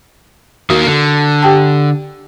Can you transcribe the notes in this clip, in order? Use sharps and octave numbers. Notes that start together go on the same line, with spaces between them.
D#3 A#3 F#4
D3
G4 G5 A5